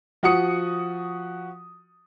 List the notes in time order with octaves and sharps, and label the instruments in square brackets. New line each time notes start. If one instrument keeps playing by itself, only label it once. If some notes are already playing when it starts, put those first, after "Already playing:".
[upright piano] F3 F#4 F#5 D#6 C#7